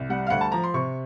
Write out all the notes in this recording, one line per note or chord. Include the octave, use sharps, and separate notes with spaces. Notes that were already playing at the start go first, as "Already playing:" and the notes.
Already playing: C2
G3 F#5
F5
D2 F#5
A5
F3 A#5
C6
C3 C#6